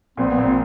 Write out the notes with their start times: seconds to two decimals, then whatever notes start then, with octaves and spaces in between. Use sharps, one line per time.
0.17 A#1 A#2 C4
0.28 B3
0.38 A#1 A#2 C4
0.48 A#2